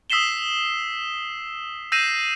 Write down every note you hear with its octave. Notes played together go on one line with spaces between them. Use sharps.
D#6 E6 B6 C7 E7 G7
E6 G6 A#6 C7 D#7 E7